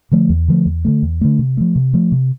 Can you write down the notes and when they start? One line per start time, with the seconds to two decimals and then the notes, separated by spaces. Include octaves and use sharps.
0.11 D3 F3 A3
0.29 E2
0.48 D3 F3 A3
0.66 E2
0.85 D3 F3 A3
1.03 E2
1.21 D3 F3 A3
1.39 C3
1.57 F3 A3
1.76 C3
1.94 F3 A3
2.12 C3